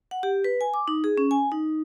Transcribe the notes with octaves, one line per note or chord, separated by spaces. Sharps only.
F#5
G4
B4
G#5
D6
D#4
G#4
C#4
G#5
D#4